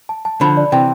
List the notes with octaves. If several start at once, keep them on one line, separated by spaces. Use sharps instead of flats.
A5
A5
D3 F3 B5
D5
C3 E3 G5